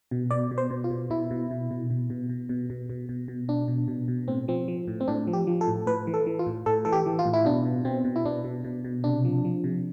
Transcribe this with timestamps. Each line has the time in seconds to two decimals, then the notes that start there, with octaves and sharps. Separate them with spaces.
0.11 B2
0.30 B2 D5
0.51 B2
0.58 C5
0.70 B2
0.84 F4
0.90 B2
1.10 B2 E4
1.31 B2
1.51 B2
1.71 B2
1.90 B2
2.10 B2
2.29 B2
2.49 B2
2.70 B2
2.89 B2
3.09 B2
3.28 B2
3.48 B2 D4
3.68 B2
3.88 B2
4.08 B2
4.28 A2 C4
4.48 F3 C4
4.68 F3
4.88 A2
5.00 C4
5.08 A2 D4
5.27 F3
5.33 G4
5.47 F3
5.61 A4
5.68 A2
5.86 A2 B4
6.07 E3
6.14 A4
6.26 E3
6.39 F4
6.47 A2
6.66 A2 A4
6.85 E3 A4
6.92 G4
7.06 E3
7.19 F4
7.25 A2
7.33 E4
7.45 B2 D4
7.65 B2
7.85 B2 C4
8.05 B2
8.16 E4
8.25 B2 D4
8.44 B2
8.64 B2
8.84 B2
9.04 C3 D4
9.25 F3
9.45 F3
9.64 C3